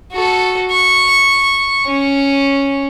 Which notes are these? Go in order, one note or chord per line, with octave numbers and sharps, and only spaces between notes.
F#4 A4
C#6
C#4